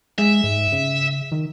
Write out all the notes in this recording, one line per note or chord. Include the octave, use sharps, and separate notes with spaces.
G#3 E5
G#2
C#3
D#3